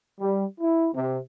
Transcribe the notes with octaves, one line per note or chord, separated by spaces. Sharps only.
G3
E4
C3